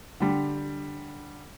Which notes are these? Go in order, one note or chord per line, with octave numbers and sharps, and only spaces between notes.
D3 G3